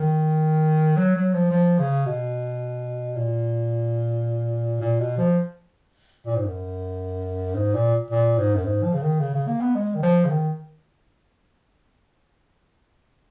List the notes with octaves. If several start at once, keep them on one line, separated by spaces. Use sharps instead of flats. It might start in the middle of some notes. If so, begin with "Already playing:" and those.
Already playing: D#3
F#3
F#3
F3
F3
C#3
B2
A#2
A#2
B2
F3
A#2
G#2
F#2
G#2
A#2
A#2
G#2
F#2
G#2
F3
C#3
D#3
C#3
C#3
A#3
B3
G#3
D#3
F3
C#3
D#3